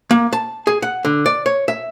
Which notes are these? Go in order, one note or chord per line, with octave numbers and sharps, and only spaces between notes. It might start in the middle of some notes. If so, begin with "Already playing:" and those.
A#3
A5
G#4
F#5
D3
D5
C#5
E5